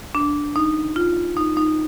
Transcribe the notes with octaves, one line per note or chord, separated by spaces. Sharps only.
D4
D#4
F4
D#4
D#4